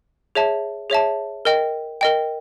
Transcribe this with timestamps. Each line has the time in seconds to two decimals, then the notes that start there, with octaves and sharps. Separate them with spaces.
0.35 G#4 C#5 E5 A5
0.90 G#4 C#5 E5 A5
1.45 A#4 D#5 G5
2.01 A#4 D#5 G5